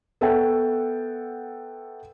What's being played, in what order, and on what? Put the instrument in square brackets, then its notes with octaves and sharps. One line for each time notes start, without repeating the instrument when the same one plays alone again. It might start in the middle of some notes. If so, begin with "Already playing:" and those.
[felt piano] B3 A4 C#5 E5 F#5 G5